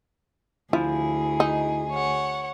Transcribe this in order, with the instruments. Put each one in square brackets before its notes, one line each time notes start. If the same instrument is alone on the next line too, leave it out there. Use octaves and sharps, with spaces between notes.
[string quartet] D2 G#4 [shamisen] F3 [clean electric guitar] E4
[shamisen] D#4
[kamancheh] C#5 F#5